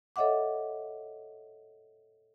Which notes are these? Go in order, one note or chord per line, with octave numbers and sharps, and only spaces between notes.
A4 C#5 D#5 E5 F#5 D6